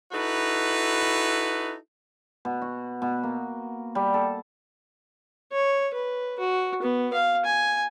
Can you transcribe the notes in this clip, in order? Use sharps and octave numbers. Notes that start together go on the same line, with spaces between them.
D#4 E4 F#4 A4 B4
B2
F#4
B2
A#3
G3
A4
C#5
B4
F#4
B3
F5
G#5